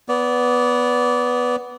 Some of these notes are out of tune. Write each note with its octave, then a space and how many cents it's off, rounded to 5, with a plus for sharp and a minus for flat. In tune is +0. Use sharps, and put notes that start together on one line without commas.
B3 +0 D5 -25